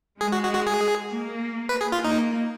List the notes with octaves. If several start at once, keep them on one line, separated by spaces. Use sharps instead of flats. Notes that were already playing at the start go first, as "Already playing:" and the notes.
G#3 G#4
F#4
F#4
F#4
G#4
A#3
B4
G#4
F4
A#3 D#4